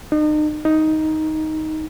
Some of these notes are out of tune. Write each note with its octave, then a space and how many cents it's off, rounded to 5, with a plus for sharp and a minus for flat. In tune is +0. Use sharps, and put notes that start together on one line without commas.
D#4 -40
D#4 +5